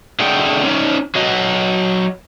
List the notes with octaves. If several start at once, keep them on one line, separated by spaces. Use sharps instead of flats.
D3 A3 G#4 D5 F#5 G5
C#4 D#4 C#5 D5
F#3 F#4 D#5